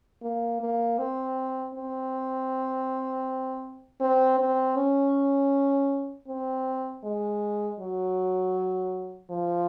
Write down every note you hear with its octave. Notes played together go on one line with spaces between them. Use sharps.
A#3
A#3
C4
C4
C4
C4
C#4
C4
G#3
F#3
F3